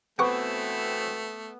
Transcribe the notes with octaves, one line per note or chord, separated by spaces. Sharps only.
B2 E3 A3 B3 C4 G4 F#5 C#6